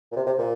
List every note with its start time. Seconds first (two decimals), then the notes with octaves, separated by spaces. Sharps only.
0.12 A#2
0.16 C3
0.26 C3
0.39 A#2